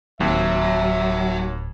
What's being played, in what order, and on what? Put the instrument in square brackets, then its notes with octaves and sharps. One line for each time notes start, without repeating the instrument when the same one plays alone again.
[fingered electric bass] D1 C4 [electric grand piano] D#2 [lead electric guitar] F#3 [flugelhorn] E5